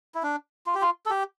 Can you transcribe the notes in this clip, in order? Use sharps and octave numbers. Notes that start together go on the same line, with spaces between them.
E4
D4
F4
G4
F4
A4
G4